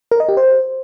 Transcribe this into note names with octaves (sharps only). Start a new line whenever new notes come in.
A#4
D#5
G4
C5